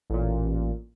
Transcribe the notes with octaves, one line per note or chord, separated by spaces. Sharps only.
A1 A#2